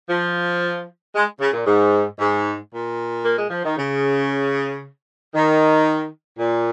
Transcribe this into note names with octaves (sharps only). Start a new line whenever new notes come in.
F3
G#3
C#3
A#2
G#2
G#2
A#2
A#3
G#3
F3
D#3
C#3
D#3
A#2